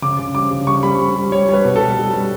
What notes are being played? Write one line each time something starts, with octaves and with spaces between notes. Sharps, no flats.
C#3 D6
C#3
G3 D6
C#3
G3 C#6
G3 B5
G3
G3
G3 C#5
G3 B4
B2
G3 A4
G3
G3